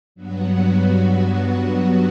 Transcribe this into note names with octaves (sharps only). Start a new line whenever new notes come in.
G2 F#3 B3 F#4